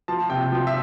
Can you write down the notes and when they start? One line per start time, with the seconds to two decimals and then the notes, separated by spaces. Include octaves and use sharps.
0.08 F3 A5
0.29 C3 G5
0.52 F3
0.67 E5